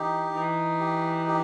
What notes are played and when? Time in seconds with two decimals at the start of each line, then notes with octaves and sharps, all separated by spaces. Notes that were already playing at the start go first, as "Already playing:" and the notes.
Already playing: E3 D#4 G4
0.32 E3 D#4
0.80 G4
1.27 G4